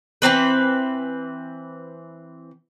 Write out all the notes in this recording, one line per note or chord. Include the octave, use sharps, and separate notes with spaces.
E3 G3 C4 B4